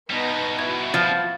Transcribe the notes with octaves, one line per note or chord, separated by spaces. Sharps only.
B2 G3 B3 D#4 A#6
E4 F#4 G#6
F3 A6